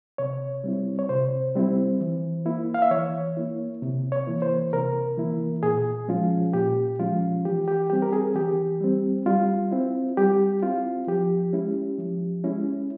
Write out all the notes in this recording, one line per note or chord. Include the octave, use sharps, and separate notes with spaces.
C3 C#5
G3 C4 E4
C#5
C3 C5
G3 C4 E4
E3
A#3 E4
F5
E5
E3 C#5
A#3 E4
C3
C#5
E3 A#3 E4
C5
C3 A#4
E3 A#3 E4
A#2 G#4
F3 G#3 C#4 F4
A#2 G4
F3 G#3 C#4 F4
E3 G4
G4
G3 C4 G4
A#4
G#4
E3 G4
G3 C4
G3 F4
C4 E4
G3 G4
C4 E4 F4
F3 G4
G#3 C#4 E4
F3
G#3 C#4 E4